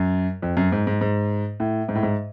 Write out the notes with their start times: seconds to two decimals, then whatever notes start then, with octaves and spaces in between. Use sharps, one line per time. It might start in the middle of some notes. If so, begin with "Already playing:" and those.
Already playing: F#2
0.42 F2
0.57 F#2
0.72 G#2
0.87 G#2
1.01 G#2
1.60 A2
1.89 G#2
1.95 A2
2.03 G#2